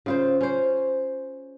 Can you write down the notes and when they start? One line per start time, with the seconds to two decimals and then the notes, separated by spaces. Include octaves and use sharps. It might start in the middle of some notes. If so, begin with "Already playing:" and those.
0.06 C#3 F4 C5
0.41 C#4 C5